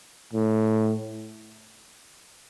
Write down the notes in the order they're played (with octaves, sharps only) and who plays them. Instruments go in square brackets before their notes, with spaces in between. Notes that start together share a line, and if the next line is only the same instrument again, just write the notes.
[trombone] A2